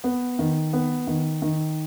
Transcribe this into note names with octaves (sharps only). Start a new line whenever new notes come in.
B3
D#3
B3
D#3
D#3